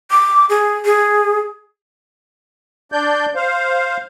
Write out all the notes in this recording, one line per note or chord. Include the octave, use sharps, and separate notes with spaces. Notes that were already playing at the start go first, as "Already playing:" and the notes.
D6
G#4
G#4
D4 D5 G6
C5 F5